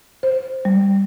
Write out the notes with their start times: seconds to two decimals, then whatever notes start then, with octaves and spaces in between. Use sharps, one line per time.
0.23 C5
0.65 G3